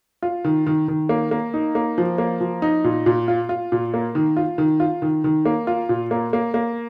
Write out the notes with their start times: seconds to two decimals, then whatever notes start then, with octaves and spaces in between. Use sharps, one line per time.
0.22 F4
0.44 D#3
0.66 D#3
0.88 D#3
1.09 A#3
1.31 A#3
1.54 D#4
1.75 A#3
1.98 F3
2.18 A#3
2.40 F3
2.62 D#4
2.84 A#2
3.06 A#2
3.28 F4
3.49 F4
3.72 A#2
3.94 A#3
4.15 D#3
4.37 F4
4.58 D#3
4.80 F4
5.02 D#3
5.24 D#3
5.45 A#3
5.67 F4
5.89 A#2
6.11 A#3
6.33 A#3
6.54 A#3